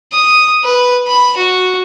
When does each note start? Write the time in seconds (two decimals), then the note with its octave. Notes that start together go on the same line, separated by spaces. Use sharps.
0.12 D#6
0.64 B4
1.07 B5
1.37 F#4